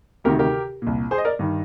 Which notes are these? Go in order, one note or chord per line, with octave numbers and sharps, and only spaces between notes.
D2 C3 D#3 G4 A#4
G4 A#4
C2 A#2
G#4 C5
D#5
A#4 D5
G2 D#3